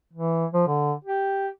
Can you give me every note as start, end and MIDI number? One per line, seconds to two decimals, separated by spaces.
0.13 0.45 52
0.54 0.62 53
0.67 0.93 50
1.05 1.48 67